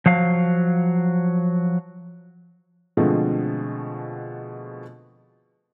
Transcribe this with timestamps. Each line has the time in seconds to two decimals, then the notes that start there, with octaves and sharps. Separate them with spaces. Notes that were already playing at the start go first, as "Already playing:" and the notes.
0.06 F3 F#3 F5
2.97 B2 D3 F3 G#3 A3 C4